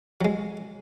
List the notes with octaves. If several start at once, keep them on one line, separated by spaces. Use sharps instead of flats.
F#3 G#3